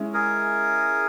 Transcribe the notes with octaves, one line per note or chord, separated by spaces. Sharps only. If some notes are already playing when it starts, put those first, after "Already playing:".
Already playing: G#3 C#4 E4
G#4 A#4